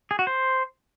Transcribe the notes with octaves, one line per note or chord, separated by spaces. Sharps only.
G#4
F#4
C5